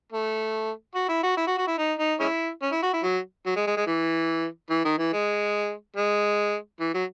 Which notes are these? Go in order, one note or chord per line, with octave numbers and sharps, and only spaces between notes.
A3
F#4
E4
F#4
E4
F#4
F#4
E4
D#4
D#4
G#3 C#4 E4
C#4
E4
F#4
E4
F#3
F#3
G#3
G#3
G#3
E3
E3
D#3
E3
G#3
G#3
E3
F#3